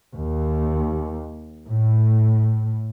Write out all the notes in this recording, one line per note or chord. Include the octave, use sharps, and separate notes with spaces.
D#2
A2